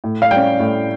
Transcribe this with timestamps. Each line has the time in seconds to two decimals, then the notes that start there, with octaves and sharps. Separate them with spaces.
0.04 A2
0.22 F5
0.31 G3 G5
0.36 C#4
0.60 A2